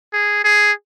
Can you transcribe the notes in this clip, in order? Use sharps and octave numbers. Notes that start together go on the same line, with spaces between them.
G#4
G#4